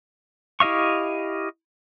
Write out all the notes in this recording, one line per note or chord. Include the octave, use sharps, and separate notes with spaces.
E4 G4 D#5 F5 C#6